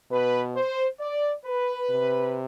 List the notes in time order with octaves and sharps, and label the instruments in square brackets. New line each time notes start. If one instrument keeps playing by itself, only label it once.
[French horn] B2 [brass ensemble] B4
[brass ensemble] C5
D5
B4
[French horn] C3